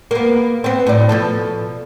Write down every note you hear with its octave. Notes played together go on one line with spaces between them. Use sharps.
A#3 B3
B3 C4
A2 D5
B2 F3 A4